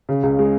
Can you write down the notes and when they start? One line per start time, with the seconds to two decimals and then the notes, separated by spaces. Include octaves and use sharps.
0.09 C#3
0.23 C#2
0.39 G#3